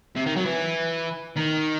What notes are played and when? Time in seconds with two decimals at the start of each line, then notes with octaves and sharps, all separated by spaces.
0.16 C3
0.26 D#3
0.36 F#3
0.45 E3
1.37 D#3